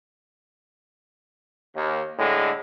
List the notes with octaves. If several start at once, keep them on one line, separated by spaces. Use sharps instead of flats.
D#2
A2 D3 G#3